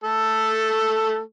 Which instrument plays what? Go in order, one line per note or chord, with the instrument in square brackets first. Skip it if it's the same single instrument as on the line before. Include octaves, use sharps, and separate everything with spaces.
[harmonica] A3 A4